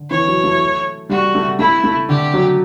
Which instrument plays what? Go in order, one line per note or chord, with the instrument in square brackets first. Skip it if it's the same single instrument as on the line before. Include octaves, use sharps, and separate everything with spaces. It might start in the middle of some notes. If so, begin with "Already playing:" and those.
Already playing: [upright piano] D3
[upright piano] E3 [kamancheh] C#5
[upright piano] F#3
A3
[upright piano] G3 [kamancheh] F#4
[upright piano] A3
[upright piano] A3 [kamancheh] E4
[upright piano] A3
[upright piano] D3 [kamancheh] G4
[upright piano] F#3